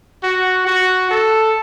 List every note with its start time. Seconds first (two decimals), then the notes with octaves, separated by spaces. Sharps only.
0.23 F#4
0.67 F#4
1.11 A4